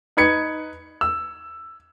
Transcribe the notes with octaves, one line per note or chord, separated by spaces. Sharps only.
D#4 B4 G#6 C#7
E6